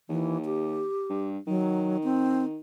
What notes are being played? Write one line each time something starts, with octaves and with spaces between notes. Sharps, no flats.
D#2 E3
G4
G2
D#3 F#3
C4